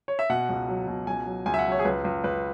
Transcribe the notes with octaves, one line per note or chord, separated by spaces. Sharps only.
C#5
E5
B2 F#5
C#2
F#3
B2
C#2 G#5
F#3
C#2 G#5
E5
F#5
F#3
C#5
G#4
C#2 B4
C#2
C#2 B4